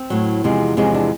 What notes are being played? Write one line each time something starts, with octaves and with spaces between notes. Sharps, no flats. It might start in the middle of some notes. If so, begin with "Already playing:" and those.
Already playing: C4
A2 F#3
E2 C3 F3 G#3
E2 C3 F3 G#3 C#4
D4